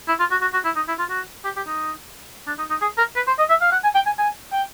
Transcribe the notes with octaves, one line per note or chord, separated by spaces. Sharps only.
E4
F4
F#4
F#4
F#4
E4
D#4
E4
F4
F#4
G4
G4
D#4
D4
D#4
D#4
G#4
A#4
B4
C5
D#5
E5
F5
F#5
G#5
G5
G#5
G#5
G5